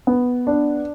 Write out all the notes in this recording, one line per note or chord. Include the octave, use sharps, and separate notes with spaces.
B3
D4